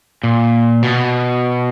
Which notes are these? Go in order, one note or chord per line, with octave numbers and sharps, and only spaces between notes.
A#2
B2